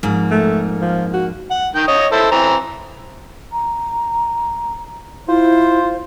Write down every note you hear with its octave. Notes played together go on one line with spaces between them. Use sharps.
F2 G#2 A#3
A3
F3
F#4
F#5
D#3 G5
C#5 D#5 D#6
E4 A4 C5
E3 C4 A#5
A#5
E4 F4 C5